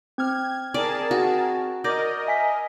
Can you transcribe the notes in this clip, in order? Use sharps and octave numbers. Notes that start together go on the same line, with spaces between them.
C4 F6 G#6
G#4 A#4 D5 A5
F#4
A#4 D5 D#5 D6 G6 A#6
E5 G#5 B6